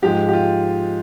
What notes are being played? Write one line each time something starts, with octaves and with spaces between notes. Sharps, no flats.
G#2 F3 G#3 G4
G4
F4